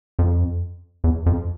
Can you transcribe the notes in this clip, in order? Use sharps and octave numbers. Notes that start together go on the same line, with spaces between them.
F2
E2
F2